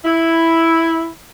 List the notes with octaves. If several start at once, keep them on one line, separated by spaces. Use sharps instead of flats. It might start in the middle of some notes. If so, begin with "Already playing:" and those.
E4